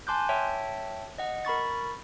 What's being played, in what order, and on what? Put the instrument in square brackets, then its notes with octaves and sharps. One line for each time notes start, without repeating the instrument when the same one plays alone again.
[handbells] G#5 A5 C6 D6 F#6 G6
C#5 E5 G5 A5
D#5 F#5
A#4 B5 C#6 A6